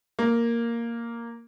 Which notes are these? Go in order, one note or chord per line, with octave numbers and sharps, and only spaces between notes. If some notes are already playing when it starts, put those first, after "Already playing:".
A#3